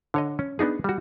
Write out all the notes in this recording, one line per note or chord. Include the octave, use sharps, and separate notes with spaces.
D3 C#5 D#5
C#4
B3 D4 D#4 G#4
G3 F#4